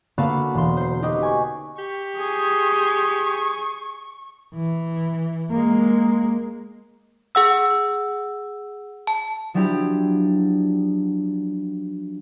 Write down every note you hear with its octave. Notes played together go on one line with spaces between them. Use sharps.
D3 A#3 B3 F#4 A4 F5
E1 C6
C5 C7
D#4 F#4 G4 B4 D#5
G#5 C#6
G4 C#6
G#4
E3
G#3 A#3
G#4 F#5 E6
A5
F3 F#3 D4 E4 G4